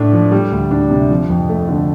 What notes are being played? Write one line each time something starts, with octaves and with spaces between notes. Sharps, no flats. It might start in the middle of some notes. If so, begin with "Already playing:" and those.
Already playing: A2 A3 D4
F3
G3
D2
D4
C3
F3
F2
A3
D3